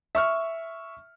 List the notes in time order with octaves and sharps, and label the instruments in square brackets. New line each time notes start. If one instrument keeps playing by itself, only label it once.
[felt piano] E5 C#6 F6